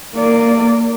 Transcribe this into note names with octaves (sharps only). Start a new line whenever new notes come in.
A#3 D5